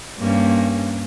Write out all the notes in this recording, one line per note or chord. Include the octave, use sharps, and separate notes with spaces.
G2 A#3 C#4